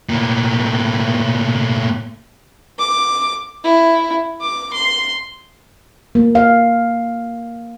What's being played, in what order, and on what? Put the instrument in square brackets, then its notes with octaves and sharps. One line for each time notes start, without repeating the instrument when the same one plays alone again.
[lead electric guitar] A2 A#3
[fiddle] D6
E4
D6
C6
[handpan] A#3
F5